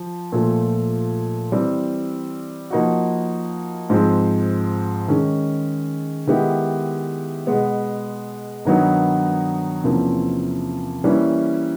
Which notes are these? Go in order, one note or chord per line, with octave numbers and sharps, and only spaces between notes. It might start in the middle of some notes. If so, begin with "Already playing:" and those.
Already playing: F3
A#2 F3 A3
E3 G3 C4
F3 A#3 D#4 F#4
G#2 F3 G#3 C4
D#3 G#3 C#4
D#3 G#3 B3 E4 G4
B2 G#3 B3
G2 D#3 F#3 B3 D#4
E2 C3 F3 A#3 C#4
E3 G3 A#3 C#4 E4